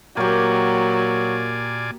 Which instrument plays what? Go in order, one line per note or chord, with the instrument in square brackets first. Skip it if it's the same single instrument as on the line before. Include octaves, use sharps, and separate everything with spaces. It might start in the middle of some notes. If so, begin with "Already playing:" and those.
[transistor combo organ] A#2 D5 G#5 [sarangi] F#3 [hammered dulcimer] A#3 G4